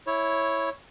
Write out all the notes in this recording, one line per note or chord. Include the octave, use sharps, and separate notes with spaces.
E4 C#5